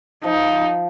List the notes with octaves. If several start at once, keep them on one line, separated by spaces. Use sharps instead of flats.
F3 D#4